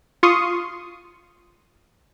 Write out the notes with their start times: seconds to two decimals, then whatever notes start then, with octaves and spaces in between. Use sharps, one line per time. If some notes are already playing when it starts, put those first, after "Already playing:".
0.23 F4 F5 C6 C#6 D#6